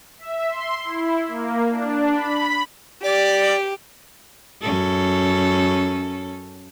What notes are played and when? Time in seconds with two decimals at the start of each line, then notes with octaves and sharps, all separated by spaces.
0.19 E5
0.49 C6
0.84 E4
1.28 A#3
1.69 D4
2.13 B5
3.03 G4 D5
4.62 F#2 C#4 A4